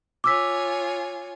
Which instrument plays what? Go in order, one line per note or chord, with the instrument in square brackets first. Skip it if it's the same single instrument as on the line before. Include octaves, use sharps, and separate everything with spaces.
[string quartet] F4 C#5 G#5 [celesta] D6 E6 B6